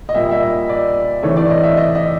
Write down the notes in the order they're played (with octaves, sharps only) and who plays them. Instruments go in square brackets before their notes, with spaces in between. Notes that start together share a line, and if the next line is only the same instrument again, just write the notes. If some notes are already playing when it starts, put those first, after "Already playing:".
[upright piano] D#5
A#2 G3 A#3 E5
E5
D#5
D5
C3 E3 A3 C#5
D5
D#5
E5
D#5
D#5